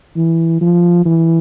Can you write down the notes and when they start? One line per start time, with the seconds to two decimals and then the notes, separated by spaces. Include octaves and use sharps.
0.16 E3
0.61 F3
1.05 E3